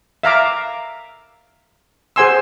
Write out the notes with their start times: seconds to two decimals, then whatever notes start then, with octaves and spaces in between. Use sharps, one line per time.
0.23 E5 F5 A#5 D6
2.16 G#4 C5 F#5 G#5 C6 E6